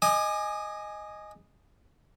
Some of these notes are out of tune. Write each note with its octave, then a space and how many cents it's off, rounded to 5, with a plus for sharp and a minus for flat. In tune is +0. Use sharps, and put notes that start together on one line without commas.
D#5 +0 G#5 +0 D6 +40